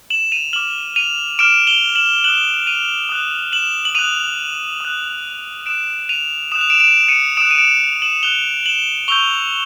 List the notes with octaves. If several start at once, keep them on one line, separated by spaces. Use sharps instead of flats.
E7 F#7
D#7 F7
D6 F6 E7 F#7
D#7 F7
D6 F6 D7 E7
F7 G7
E7 F#7
D#6 F#6 E7 F#7
D#7 F7
D#6 F#6
E7 F#7
F#7
D#6 F#6 D#7 F7
D#6 F#6
D#6 F#6 D7 E7
D#7 F7
D#6 F#6 E7
F7
D7 E7
D7 E7
C#7 D#7
D#6 F#6 D7 E7
D#7
D7 E7
E7 F#7
D#6 F#6 F7 G7
E7 F#7
C#6 E6 G6 F7 G7